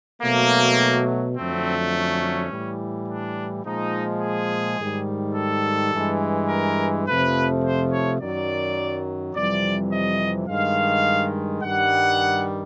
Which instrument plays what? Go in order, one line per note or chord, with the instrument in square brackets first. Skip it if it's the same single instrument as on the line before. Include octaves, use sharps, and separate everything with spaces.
[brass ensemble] B2 F#3 A3 A#3
F2 D3 F#3 A3 C4
C#4
A2 E3 G3
D4
A#2 F3 G#3 D#4
G#4
G#2 D#3 G3
A4
G2 E3 G#3
A#4
F2 C3 F3 A3 B4
C5
C#5
F#2 D#3 F#3 D5
F2 C3 E3 G3 D5
D#5
G2 D#3 G#3 F5
G2 D#3 G3 F#5